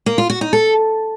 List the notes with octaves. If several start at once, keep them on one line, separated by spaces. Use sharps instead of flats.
A#3
F4
F#4
D#4
A4